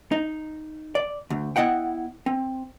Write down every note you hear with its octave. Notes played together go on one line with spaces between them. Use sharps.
D#4
D5
D2
B3 E4 D#5 F#5 G5
C4